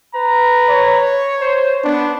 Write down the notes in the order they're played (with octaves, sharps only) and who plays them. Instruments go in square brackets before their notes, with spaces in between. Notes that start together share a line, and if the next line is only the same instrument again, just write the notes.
[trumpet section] B4 A#5
[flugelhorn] C#5
[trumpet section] C5
[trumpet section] B3 [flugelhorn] D4